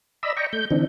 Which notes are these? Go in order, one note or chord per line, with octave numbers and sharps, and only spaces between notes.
D5 D#5 A#5 B5 E6
D5 D#5 G5 A#5 C#6
A3 G6
D3 E3 C4 D4 D#4